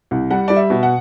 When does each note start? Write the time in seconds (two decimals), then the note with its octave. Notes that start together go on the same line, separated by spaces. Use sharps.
0.11 C2
0.31 G3 F#5
0.48 G3 D5
0.56 E5
0.70 B2
0.83 F#5